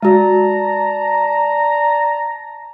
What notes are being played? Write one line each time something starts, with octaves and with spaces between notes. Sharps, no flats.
G#3 F#4 D5 A5 A#5